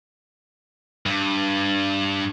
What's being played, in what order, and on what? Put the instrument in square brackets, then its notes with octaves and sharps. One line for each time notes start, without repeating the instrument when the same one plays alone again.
[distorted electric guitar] G2